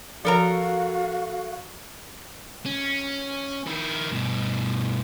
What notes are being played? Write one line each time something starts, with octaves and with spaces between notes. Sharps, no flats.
F3 F#4 A4 A#4 C#5 F5 A#5
C#4
D#3 E4
G2 B2